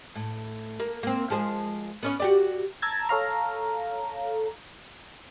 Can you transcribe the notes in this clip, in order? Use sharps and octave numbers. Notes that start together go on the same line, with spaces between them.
A2
A#3
A#3 C4
F3 G#3 C5
B3 C#4 C#5
F#4 G4 D5
A5 A#5 E6 G#6 A6
A4 C#5 F5 A#5